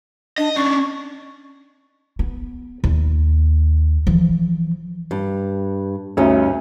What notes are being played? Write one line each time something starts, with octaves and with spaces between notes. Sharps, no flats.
D4 D#5
C#4 D4 C#6
B3
D#2
E3 F3
G2
D2 G2 C#4 D#4 E5